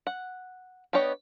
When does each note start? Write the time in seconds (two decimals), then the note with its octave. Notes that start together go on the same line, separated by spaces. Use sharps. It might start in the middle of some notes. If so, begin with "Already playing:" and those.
0.07 F#5
0.93 B3 D4 G4 C#5 D#5